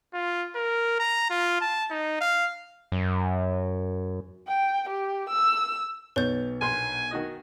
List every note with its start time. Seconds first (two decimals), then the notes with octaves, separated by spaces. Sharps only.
0.14 F4
0.55 A#4
0.99 A#5
1.30 F4
1.61 A5
1.90 D#4
2.20 F5
2.92 F#2
4.47 G5
4.90 G4
5.30 E6
6.16 B1 B4 C#5 G6 A6
6.62 A#1 G#5 C6
7.11 D#3 F#4 D#5